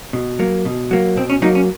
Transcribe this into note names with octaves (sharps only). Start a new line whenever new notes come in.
B2
F#3 A#3
B2
F#3 A#3
B2 C4
C#4
F#3 A#3 D#4
C#4